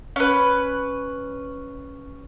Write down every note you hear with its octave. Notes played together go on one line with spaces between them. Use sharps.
C#4 B4